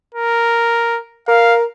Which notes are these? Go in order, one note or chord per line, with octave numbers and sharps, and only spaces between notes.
A#4
A#4 F5